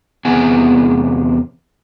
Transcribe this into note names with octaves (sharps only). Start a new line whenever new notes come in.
E2 C3 B3 G#4 F#5 G#5